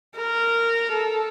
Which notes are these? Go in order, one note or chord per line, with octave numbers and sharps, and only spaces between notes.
A#4
A4